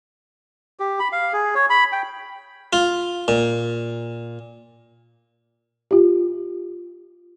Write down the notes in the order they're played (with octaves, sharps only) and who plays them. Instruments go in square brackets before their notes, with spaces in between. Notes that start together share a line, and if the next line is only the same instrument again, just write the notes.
[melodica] G4
B5
F5
G#4
C#5
B5
G5
[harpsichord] F4
A#2
[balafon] F4 G4